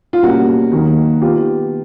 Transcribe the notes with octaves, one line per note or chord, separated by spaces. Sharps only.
F4
B2 G3 A#3 C#4 F#4
D#3 F#3 A#3
B3 D#4 F4 G4